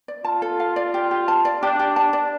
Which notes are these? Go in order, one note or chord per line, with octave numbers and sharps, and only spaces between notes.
D5
F4 A5
A4
F5
D5
G4
G4
A5
D5
D4 G4
G4
D4 A5
D5